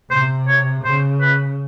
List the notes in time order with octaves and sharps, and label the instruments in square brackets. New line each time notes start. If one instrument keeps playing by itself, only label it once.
[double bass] C3 [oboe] C5
[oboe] C#5
[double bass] C#3 [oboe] C5
[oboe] B4